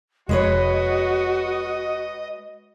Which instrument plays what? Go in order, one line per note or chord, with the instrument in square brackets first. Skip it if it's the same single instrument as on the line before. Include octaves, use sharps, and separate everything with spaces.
[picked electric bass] F1 [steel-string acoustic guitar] G#3 B4 C#5 [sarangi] F#4 [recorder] D#5